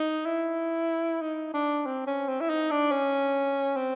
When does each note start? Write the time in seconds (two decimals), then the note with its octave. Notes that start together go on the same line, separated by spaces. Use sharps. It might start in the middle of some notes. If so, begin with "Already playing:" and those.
Already playing: D#4
0.25 E4
1.21 D#4
1.54 D4
1.86 C4
2.07 C#4
2.28 C4
2.40 E4
2.49 D#4
2.71 D4
2.91 C#4
3.76 C4